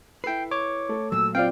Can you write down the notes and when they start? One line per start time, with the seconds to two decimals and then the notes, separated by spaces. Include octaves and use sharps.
0.24 E4 A4 B4 G5 C7
0.51 C#5 D6
0.89 A3
1.12 A#2 F#3 E6
1.35 C4 F4 D5 F5 G5